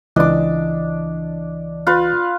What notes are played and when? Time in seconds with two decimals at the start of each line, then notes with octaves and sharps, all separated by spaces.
0.16 C#2 E3 D4 D#5 D6
1.87 F4 B4